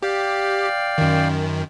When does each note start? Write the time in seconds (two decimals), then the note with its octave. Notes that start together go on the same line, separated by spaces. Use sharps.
0.03 G4 D5 F5 G5
0.98 F#2 D#3